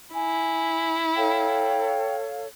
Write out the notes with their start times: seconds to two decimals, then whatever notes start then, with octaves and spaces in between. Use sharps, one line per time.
0.14 E4 G#5
1.16 A4 C#5 F5 G5